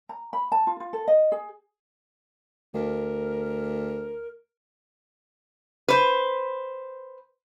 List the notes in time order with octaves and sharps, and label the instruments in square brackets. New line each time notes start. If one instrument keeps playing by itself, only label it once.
[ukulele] A#5
B5
A5
F4
F4
A4
D#5
G#4
[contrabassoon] D2 [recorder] A#4
[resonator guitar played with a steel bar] B4 C5